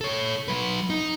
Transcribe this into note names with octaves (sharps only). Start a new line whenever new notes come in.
A4 C#5
F#3 B4
D#4